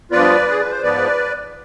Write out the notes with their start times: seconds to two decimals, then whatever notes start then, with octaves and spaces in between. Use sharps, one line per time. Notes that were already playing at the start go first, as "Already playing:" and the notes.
0.11 G2 F3 B3 F4 B4 D5
0.50 G#4
0.60 B4
0.71 C5
0.82 G#2 F3 B3 B4 D5